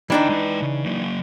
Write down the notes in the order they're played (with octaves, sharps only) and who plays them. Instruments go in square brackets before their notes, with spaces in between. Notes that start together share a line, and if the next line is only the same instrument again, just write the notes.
[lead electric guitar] D2 G5 [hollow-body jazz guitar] E3 D4 D#4
[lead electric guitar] G#3 B4
C#3
F#3 A#3